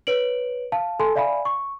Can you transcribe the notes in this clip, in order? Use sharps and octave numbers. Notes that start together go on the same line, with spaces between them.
B4 C#5 D7 F#7
F5 A5
A4 G#5 A5 C6
D5 E5 F5 G#5 B5
C#6